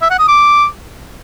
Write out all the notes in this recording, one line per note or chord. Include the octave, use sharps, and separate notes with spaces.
E5
F#5
D#6
D6